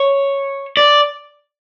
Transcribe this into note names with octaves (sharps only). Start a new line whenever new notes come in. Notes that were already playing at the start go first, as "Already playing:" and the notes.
Already playing: C#5
D5